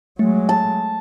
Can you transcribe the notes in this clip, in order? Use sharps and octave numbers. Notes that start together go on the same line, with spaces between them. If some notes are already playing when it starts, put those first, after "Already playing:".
F#3 G#3 A3
A5